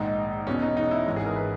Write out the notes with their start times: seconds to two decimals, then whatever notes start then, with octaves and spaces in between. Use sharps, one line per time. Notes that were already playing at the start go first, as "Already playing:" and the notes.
Already playing: A#1 G#2 D#3 G#3 D#4
0.47 E1 E2 B2 C#4
0.62 D#4
0.77 D#4
0.91 E4
1.06 G#1 G#2 E3 G#3
1.16 G#4
1.26 A#4
1.36 B4